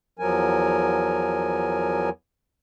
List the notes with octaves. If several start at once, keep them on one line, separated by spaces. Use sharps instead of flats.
E2 F3 F#3 A#4 G#5